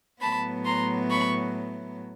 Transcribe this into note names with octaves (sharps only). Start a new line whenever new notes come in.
A2 F#3 B3 A5 B5
A#5 C6
B5 C#6